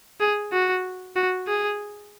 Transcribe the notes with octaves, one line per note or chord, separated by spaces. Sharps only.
G#4
F#4
F#4
G#4